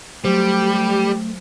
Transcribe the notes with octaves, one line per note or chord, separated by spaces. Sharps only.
F#3 G3 A3 G4 C5